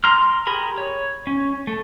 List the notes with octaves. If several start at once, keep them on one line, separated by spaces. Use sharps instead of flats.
A#5 C6 F6
G4 G#4 A#4 B5
C#5
C#4
A3